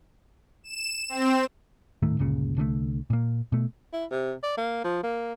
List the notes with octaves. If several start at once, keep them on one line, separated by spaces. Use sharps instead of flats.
E7
C4
D#1 A2 D#3 A3
G1 C#2 A#2 C#3
C2 D3 D#3 A3
A#2 A#3
B2 A3
E4
C3
D5
A#3
F3
A#3